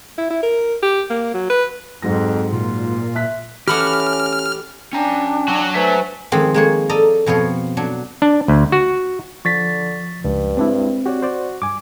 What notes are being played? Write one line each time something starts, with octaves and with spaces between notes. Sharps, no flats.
E4
E4
A#4
G4
A#3
F#3
B4
F2 G#2 F#3 A#6
A#2 F4
E5 F#6 B6
E3 A3 C#4 F#4 G4 B5 D6 F6
C#4 D4 G5 G#5 A#5
F#3 F#4
A3 B4 C5 E5 G#5
D#3 F3 G#3 C4 G4
G#3 A#3 C#5
A4 D5 D#5 A#5
F2 B2 F3 C#5 F5
F#3 D4
D4
D2
F#4
D3 F3 C#6 A6 B6
C#2 G2
G#3 C4 D4 E4
F#4 G4 C#5 D5
C5 D5
G2 G#5 D6